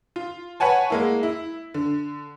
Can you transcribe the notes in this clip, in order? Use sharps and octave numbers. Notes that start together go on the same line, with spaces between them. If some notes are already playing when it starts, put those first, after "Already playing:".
F4
B4 C#5 F#5 G#5 A5
G#3 A#3 E4
E4
D3